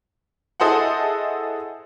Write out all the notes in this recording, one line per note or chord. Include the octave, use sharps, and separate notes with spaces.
E4 G#4 A4 C5 D#5 F#5